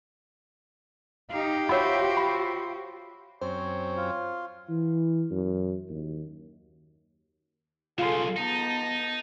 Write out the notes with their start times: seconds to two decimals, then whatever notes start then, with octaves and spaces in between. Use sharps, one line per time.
1.32 D#4 G4 F5
1.69 F4 F#4 C5 C#5 E5 F#5 B5
2.17 B5
3.41 F#2 C4 C5 C#5
3.97 F4
4.69 E3
5.31 F#2
5.89 D#2
7.98 B1 C#3 F4 G#4 A4 C6
8.36 B3 D#4 A5